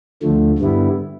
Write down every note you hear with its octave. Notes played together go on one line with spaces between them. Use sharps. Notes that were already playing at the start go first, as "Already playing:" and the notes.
D2 D3 F3 A3
G2 D3 G3 B3 E4